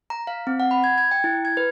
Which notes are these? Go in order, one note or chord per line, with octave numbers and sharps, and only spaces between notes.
A#5
F5
C4
F#5
B5
G#6
G#6
G5
E4
G#6
B4